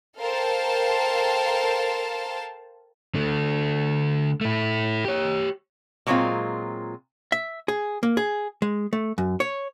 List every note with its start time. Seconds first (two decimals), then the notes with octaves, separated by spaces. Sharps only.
0.18 A4 A#4 C5 F5 G5 A5
3.15 D3 A3
4.41 A3 E4
5.05 G4 C#5
6.07 A#2 F#3 G#3 A3 C4 F4
7.32 E5
7.68 G#4
8.03 A#3
8.17 G#4
8.62 G#3
8.93 A3
9.18 F#2
9.40 C#5